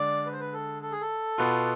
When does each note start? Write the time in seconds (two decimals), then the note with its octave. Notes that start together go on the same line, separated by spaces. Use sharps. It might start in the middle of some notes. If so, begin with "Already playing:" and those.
Already playing: D3 G#3 D5
0.26 B4
0.33 C5
0.40 B4
0.54 A4
0.82 A4
0.92 G#4
1.01 A4
1.38 B2 B3 F4